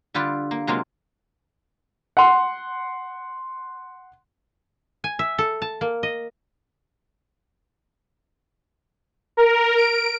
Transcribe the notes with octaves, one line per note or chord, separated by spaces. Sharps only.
D3 G3 F4 B4 D5
A#3
C3 F#3 G#3 A#3 F4
F#5 C6
G#5
E5
A4
A5
A#3
D#5
A#4
D7